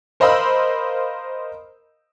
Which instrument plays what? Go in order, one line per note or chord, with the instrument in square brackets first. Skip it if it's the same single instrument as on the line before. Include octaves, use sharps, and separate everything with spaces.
[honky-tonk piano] A#4 C5 D#5 F5 B5 E6